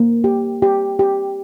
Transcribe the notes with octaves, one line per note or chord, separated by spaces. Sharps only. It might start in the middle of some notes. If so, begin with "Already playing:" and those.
Already playing: A#3
G4
G4
G4